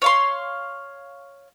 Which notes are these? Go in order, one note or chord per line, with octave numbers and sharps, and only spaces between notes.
C#5 F5 C6